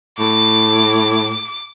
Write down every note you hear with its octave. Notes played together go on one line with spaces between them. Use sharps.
A2 D6